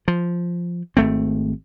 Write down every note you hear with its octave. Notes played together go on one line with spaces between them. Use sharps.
F3
G#1 A3 C4